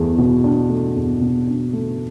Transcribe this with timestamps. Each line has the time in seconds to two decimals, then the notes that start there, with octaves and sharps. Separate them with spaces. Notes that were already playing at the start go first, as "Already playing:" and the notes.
Already playing: E2 A3
0.18 B2
0.44 D4
0.69 A3
0.96 E2
1.21 B2
1.47 D4
1.73 A3